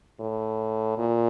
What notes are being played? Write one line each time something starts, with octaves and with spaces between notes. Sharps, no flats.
A2
A#2